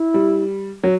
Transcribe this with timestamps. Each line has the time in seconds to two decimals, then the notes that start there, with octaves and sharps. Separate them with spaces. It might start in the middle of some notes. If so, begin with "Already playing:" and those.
Already playing: E4
0.14 G3
0.83 F#3